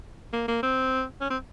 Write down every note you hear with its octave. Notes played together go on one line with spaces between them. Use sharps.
A#3
A#3
C4
C#4
C4